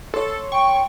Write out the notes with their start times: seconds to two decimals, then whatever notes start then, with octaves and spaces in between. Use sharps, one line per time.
0.14 A4 C#5 C6
0.52 G5 C#6